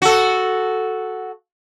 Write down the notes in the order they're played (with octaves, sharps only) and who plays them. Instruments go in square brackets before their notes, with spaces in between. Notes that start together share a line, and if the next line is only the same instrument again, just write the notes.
[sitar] F#4 A4